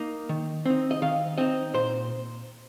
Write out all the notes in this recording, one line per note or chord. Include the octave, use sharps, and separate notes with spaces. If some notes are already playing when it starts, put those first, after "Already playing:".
Already playing: A#3 D#4
D#3
C4 D#4
D#5
D#3 F5
C4 D#4 D#5
A#2 C5